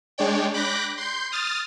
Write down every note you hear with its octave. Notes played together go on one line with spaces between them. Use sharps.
G#3 D4 C#5 D5 G5
B5 D6 F#6 G6 A#6
C6 G6
D#6 F6 A6